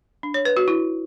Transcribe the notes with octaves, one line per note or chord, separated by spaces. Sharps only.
D4
C#5
B4
F#4
E4